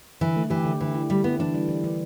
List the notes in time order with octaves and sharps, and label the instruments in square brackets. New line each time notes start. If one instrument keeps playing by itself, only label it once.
[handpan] D3 [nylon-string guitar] E3
[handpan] A3
[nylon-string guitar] E3 [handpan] G4
[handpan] D3
[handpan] D3 [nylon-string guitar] E3
[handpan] E4
[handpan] D3 [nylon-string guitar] G3
[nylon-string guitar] B3 [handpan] E4
[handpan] E3 [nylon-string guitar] D4
[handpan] G3
E3
E3